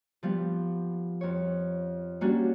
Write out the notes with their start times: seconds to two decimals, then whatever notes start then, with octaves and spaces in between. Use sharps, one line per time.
0.23 F3 G3 B3
1.21 F2 C#5
2.21 G3 A#3 C#4 D4 F#4